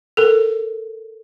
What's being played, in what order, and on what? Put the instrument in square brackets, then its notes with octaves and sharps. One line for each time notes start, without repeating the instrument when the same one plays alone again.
[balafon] A4 A#4